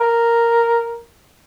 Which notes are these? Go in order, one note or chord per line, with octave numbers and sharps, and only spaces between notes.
A#4